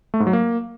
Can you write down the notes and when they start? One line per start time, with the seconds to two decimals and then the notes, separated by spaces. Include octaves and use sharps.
0.14 A3
0.20 G#2
0.27 F#3
0.33 A#3